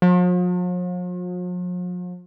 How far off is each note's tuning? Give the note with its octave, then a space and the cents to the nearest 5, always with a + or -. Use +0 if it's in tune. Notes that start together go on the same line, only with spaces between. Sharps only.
F3 +45